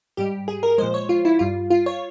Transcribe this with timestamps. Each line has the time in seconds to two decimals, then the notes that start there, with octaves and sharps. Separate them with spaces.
0.17 G#2 G3 G4
0.48 G#4
0.63 A#4
0.78 A#2 F3 G#3 C5
0.94 C#5
1.09 F4
1.25 E4
1.39 G2 G3 F4
1.70 F4
1.86 C#5